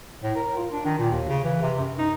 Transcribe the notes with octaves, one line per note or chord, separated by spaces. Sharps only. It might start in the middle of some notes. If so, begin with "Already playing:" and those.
A2
A#4
F4
D4
D#3
A#2
D#2
C#3
E3
C3
F#2
D#4